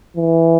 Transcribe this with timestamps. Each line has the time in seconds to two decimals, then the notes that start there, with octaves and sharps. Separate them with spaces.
0.17 E3